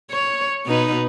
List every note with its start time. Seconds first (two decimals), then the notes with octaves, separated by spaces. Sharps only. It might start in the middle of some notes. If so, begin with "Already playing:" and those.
0.11 C#5
0.66 B2 D#4 B4